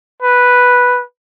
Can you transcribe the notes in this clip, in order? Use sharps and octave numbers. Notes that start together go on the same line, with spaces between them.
B4